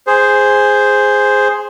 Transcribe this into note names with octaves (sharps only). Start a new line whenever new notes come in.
G#4 C5